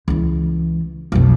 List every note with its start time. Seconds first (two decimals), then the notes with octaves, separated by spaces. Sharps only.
0.08 C#2 E3
1.12 B1 F2